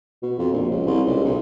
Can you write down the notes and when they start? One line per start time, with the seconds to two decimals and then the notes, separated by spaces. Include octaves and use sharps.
0.23 B2
0.38 F2
0.52 A#1
0.70 C#2
0.86 C2
1.07 C#2
1.25 B1